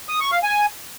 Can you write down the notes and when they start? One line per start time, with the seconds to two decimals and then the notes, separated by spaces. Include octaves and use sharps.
0.09 D#6
0.20 C#6
0.32 F5
0.43 G#5